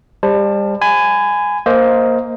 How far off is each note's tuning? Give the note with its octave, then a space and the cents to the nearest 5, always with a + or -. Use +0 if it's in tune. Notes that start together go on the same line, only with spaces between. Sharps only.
G3 +35 C5 +30 A5 +0
G#5 +0 B5 +35
A#3 +0 C5 +0 D#5 +20